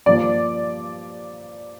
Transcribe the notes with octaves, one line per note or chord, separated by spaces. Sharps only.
G2 F3 A#3 D5